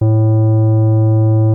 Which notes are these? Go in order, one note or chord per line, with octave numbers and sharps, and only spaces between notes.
A2